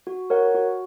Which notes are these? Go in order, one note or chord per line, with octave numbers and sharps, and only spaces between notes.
F#4
A#4 C#5 F#5
F#4